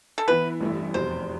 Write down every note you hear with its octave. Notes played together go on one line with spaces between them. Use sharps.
A4
E3 B3 E4 B4
A1 G2 E3 A3 E4
F1 E2 B2 G3 C5